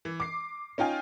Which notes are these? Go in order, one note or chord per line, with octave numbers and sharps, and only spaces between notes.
E3
D6 C7
C#4 D#4 F4 G5 G#5